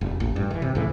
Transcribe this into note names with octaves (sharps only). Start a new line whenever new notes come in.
E1
A1
G2
D#3 E3
C3
C#2 A2 E3